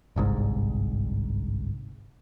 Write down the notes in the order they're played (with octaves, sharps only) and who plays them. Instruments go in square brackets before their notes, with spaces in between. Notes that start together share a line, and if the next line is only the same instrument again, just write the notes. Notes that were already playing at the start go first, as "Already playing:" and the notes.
[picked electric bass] G1 C2 G#2